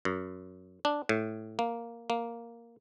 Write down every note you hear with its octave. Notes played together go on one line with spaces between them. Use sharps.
F#2
D4
A2
A#3
A#3